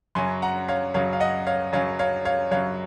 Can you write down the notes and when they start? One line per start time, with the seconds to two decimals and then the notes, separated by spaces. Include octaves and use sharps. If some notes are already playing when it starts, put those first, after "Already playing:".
0.15 F#2 C#3 F#3 G#5 C6
0.42 F#5 A#5
0.68 C#5 F5
0.94 F#2 C#3 F#3 C#5 F5
1.13 F5
1.20 D#5 F#5
1.47 C#5 F5
1.73 F#2 C#3 F#3 C#5 F5
1.99 C#5 F5
2.25 C#5 F5
2.51 F#2 C#3 F#3 C#5 F5